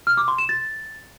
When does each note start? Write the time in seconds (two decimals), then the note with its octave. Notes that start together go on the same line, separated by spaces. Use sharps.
0.07 F6
0.17 D6
0.28 C6
0.38 E7
0.49 A6